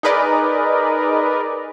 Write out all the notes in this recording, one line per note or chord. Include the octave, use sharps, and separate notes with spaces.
D#4 G#4 A#4 B4 D5 D#5